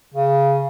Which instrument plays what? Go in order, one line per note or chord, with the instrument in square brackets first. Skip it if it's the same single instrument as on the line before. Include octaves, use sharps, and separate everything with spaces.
[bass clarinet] C#3